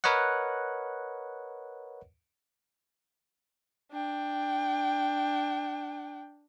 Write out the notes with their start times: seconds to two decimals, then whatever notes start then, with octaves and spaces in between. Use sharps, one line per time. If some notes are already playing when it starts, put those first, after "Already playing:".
0.04 A#4 B4 C#5 D#5 F#5
3.92 D4 G5